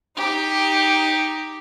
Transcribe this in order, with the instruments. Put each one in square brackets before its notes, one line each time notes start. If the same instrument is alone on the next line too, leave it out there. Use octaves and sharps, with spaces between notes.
[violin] D#4 G4